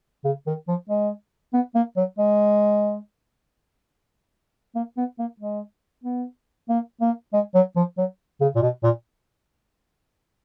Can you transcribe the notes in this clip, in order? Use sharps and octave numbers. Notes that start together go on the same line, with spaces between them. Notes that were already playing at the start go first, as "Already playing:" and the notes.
C#3
D#3
F3
G#3
B3
A#3
F#3
G#3
A#3
B3
A#3
G#3
B3
A#3
A#3
G#3
F#3
F3
F#3
C#3
A#2
B2
A#2